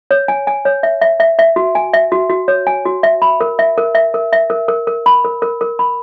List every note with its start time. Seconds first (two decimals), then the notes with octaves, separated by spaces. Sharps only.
0.11 C#5
0.28 G#5
0.47 G#5
0.65 C#5
0.83 E5
1.02 E5
1.20 E5
1.39 E5
1.56 F#4
1.75 G#5
1.93 E5
2.12 F#4
2.30 F#4
2.48 C#5
2.67 G#5
2.85 F#4
3.03 E5
3.22 B5
3.40 A#4
3.59 E5
3.78 A#4
3.95 E5
4.14 A#4
4.33 E5
4.50 A#4
4.68 A#4
4.87 A#4
5.06 B5
5.24 A#4
5.42 A#4
5.61 A#4
5.79 B5